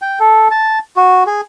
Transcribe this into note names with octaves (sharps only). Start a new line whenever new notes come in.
G5
A4
A5
F#4
G#4